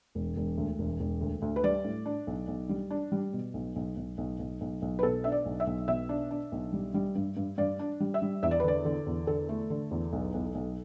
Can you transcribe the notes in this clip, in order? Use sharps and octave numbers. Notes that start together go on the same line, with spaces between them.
E1
E1
D2
E1
E1
D2
D2
B4
G3 D5
A2
D4
B1
B1
G3
D4
G3
B2
B1
B1
B1
B1
B1
B1
B1
B4
B2 A4
D4 E5
D5
B1
E5
B1
B2 E5
D4
D4
B1
G3
G3
G2
G2
G2 D5
D4
G3
E5
G3
E2 E5
D5
B4
D3 D5
D3
E2
D3 A4
A3
D3
E2
B1
B1
B1